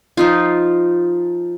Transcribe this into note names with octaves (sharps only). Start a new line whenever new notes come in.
F3 D#4 F4